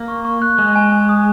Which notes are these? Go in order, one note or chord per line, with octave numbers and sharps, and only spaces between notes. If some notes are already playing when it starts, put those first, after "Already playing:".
Already playing: A#3
C#6
C#6
F#6
G#3 F#6
G#5
G#5
D#6